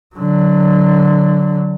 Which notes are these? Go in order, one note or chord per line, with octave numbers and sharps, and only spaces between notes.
D3 F#3